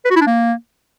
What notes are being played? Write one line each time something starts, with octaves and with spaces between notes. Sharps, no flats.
B4
F#4
E4
D4
A#3